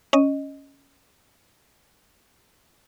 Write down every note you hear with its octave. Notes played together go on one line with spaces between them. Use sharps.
C#4 D#5